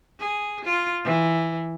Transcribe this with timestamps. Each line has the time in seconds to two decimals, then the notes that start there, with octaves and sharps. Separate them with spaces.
0.19 G#4
0.65 F4
1.04 E3